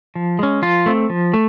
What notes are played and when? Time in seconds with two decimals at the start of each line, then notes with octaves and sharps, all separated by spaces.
0.15 F3
0.39 G#3 C#4
0.62 F3 F4
0.86 A3 C4
1.10 F3
1.34 A3